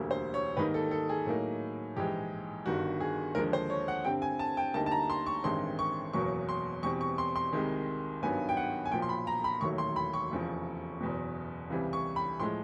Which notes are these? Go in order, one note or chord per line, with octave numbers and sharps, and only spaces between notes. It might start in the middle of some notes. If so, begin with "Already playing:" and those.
Already playing: E1 D2 D3 G3 A#3
C5
C#5
G#2 D#3 G3 A#3 D#4 B4
A4
A4
G#4
A2 F#3 A#3 D#4
A#1 G#2 E3 G#3 G4
G1 G2 D#3 G3 F#4
G#4
D#2 D3 F3 G#3 A#4
C5
C#5
F#5
G2 D3 G3 C4 G5
G#5
A5
G5
D2 D3 G3 A#3 D#4 A5
A5
A#5
C6
C#6
A1 G2 D#3 G#3 C4 C6
C#6
F#1 E2 B2 F#3 A#3 C#6
C6
E2 B2 G3 C4 C#6
C#6
C6
C6
C2 C3 D#3 G#3
G#1 G2 D#3 F#3 B3 G#5
G5
F#5
G#5
B1 A#2 F3 G5
C6
B5
A#5
B5
E1 D#2 D#3 F#3 A3 C#6
C6
B5
C#6
F1 E2 C#3 F3
F#1 E2 B2
C#2 C3 E3 G3
C#6
B5
A2 F3 G#3 C6